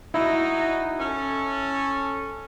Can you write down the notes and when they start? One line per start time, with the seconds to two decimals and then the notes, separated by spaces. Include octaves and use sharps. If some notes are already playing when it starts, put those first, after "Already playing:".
0.14 D#4 E4 F#4
0.99 C#4 A4